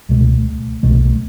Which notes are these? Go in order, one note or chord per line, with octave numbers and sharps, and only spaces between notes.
C#2 B2 A3
B1 B2 A3